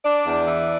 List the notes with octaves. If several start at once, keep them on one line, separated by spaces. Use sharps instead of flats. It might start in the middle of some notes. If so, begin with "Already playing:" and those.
D4 D5
E2
E3